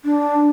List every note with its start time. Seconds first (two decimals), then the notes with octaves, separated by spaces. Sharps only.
0.05 D4